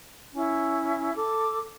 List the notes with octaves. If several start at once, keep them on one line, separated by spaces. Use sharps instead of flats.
C#4 E4
A4 D6